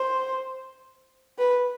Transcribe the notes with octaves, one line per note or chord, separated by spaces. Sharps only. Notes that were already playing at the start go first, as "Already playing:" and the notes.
Already playing: C5
B4